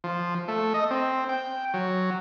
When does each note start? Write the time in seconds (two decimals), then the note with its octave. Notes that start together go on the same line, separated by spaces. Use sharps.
0.04 F3
0.48 A3
0.74 D#5
0.91 C4
1.29 G5
1.74 F#3